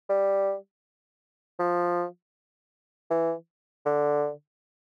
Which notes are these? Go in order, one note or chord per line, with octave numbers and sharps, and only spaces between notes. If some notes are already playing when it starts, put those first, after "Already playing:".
G3
F3
E3
D3